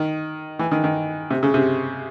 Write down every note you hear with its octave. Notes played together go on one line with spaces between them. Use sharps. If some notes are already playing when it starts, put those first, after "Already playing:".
Already playing: D#3
E3
D#3
D#3
C3
C#3
C3